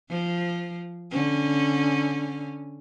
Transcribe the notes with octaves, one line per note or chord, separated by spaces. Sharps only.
F3
D3 C#4